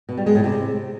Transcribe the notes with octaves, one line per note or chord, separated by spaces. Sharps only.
B2
G3
G#3
A2
C3